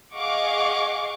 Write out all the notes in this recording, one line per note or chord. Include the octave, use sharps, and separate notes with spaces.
G#4 D#5 F5 F#5 C#6 D6